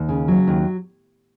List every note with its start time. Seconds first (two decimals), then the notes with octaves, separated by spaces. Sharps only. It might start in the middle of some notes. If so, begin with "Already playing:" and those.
Already playing: D#2
0.09 C#3
0.28 F#3
0.47 D#2